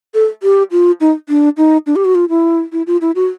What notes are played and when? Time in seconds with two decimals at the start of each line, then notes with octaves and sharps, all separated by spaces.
0.14 A4
0.43 G4
0.71 F4
1.01 D#4
1.29 D4
1.57 D#4
1.87 D4
1.96 G4
2.05 F#4
2.15 F4
2.29 E4
2.72 E4
2.87 F4
3.01 E4
3.15 F#4